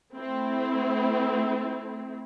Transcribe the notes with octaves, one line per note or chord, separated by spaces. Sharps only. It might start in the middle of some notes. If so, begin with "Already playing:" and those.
A3 C4 E4